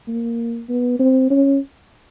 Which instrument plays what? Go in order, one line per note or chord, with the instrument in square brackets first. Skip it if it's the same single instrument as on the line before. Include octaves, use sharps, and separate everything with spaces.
[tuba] A#3
B3
C4
C#4